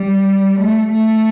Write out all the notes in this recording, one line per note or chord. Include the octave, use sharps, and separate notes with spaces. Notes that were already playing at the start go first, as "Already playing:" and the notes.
Already playing: G3
A3
A3